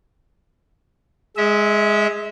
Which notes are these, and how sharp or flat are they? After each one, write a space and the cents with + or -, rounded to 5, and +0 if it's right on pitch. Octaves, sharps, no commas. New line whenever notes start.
G#3 +0 E5 -30